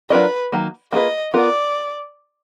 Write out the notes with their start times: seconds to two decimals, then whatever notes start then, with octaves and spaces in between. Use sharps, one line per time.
0.10 F#3 D4 F4 A#4 B4 D#5
0.52 D#3 F#3 A#3
0.92 A#3 F4 G#4 B4 D#5
1.34 B3 F4 A#4 D5